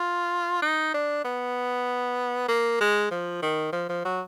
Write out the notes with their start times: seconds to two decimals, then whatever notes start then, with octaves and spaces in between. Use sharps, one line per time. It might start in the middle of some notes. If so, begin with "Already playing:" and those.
Already playing: F4
0.62 D#4
0.94 D4
1.24 B3
2.48 A#3
2.81 G#3
3.11 F3
3.42 D#3
3.73 F3
3.89 F3
4.05 F#3